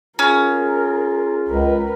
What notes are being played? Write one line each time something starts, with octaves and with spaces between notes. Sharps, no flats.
C#4 F4 G#4 A#4
C#2 A#4 B4